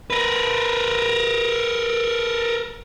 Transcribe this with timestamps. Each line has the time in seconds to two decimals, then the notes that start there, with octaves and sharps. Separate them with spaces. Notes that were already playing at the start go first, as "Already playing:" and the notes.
0.10 A#4 B4